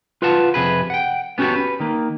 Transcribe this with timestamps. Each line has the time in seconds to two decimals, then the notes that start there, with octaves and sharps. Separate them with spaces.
0.22 F4 B4 F5 F#5 A5
0.54 F2 C3 G#4 B4
0.90 F#5 G5
1.38 B3 C#4 F#4 G4 A4
1.55 B4
1.80 D#3 A#3